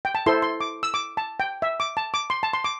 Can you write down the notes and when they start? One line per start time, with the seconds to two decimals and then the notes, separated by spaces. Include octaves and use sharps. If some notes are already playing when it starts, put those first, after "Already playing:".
0.05 G5
0.15 A5
0.26 E4 A4 C5 C6
0.42 C6
0.61 D6
0.83 E6
0.94 D6
1.17 A5
1.40 G5
1.62 E5
1.80 D6
1.97 A5
2.14 D6
2.30 C6
2.43 A5
2.54 C6
2.64 D6